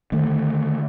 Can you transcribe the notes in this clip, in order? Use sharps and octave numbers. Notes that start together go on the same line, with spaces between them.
D3 D#3 A3